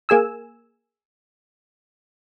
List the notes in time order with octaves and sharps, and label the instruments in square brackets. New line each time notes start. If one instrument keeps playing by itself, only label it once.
[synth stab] A#3 G#4 G#5 E6